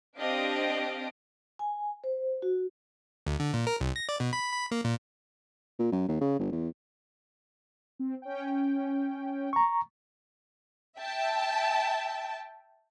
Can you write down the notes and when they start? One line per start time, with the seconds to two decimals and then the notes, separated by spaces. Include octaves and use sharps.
0.18 C4 D4 G4 D#5 F5 D7
1.59 G#5
2.04 C5
2.42 F#4
3.27 D2
3.40 D3
3.53 A#2
3.67 A#4
3.81 C2
3.96 A#6
4.09 D5
4.20 B2
4.33 B5
4.52 B5
4.71 A#3
4.85 A#2
5.79 A#2
5.92 F#2
6.08 D#2
6.21 C#3
6.39 G1
6.52 E2
7.99 C4
8.22 C#4 G5
9.53 A#5 C#6
10.99 E5 G5 A5